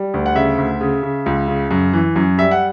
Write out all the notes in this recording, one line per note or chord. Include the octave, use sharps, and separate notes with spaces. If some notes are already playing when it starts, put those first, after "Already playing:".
Already playing: G3
D2
F#5
C#3 E5
D2
C#3
C#3
C#2
C#3
F#2
E3
F#2
G3 E5
F#5